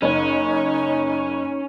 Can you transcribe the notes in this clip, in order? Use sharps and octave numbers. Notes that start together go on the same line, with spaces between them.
F#1 C#4 D#4 C#5